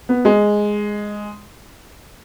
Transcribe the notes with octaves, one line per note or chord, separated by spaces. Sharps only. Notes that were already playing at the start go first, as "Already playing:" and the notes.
B3
G#3